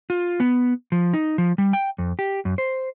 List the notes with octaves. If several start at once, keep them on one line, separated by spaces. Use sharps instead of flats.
F4
B3
F3
D#4
F3
G3
G5
F2
G4
F#2
C5